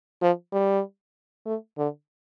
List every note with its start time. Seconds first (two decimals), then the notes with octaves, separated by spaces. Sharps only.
0.22 F3
0.53 G3
1.46 A3
1.78 D3